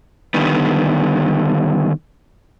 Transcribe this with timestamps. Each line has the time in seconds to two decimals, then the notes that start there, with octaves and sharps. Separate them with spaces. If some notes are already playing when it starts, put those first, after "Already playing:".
0.34 D3 D#3 G3 B3